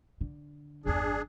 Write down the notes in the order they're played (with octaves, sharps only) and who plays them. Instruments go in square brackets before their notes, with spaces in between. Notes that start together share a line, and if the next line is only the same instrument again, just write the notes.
[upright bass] D3
[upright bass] G1 E2 [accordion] D4 G#4